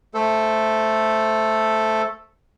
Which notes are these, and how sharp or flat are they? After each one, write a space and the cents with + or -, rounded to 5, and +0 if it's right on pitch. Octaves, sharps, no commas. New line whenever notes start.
A3 +0 A4 +0 C5 +0